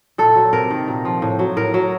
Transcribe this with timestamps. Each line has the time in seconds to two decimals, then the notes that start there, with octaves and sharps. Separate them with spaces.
0.18 A#2 A4
0.35 F#3
0.53 C3 A#4
0.70 D#3
0.88 A#2
1.05 F3
1.22 A2
1.39 F#3
1.57 A2 A#4
1.74 F#3